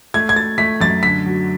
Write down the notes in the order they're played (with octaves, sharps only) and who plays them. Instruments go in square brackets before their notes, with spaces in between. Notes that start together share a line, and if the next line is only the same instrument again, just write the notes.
[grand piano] A3 G#6
G#6
A3 A6
A3 B6
F#2 A6
D3 B6
F#3